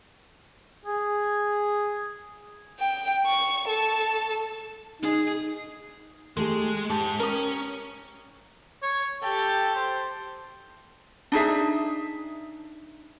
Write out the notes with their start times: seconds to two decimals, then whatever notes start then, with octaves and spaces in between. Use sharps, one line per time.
0.85 G#4
2.80 G5
3.26 C#6
3.68 A4
5.02 D#4 G#4
6.37 G#3 A3 G4 G#4
6.90 G#2 G4 A5
7.20 C#4 A#4 D#6
8.82 C#5
9.22 G4 A4
9.75 C5
11.32 D4 D#4 G#4 E5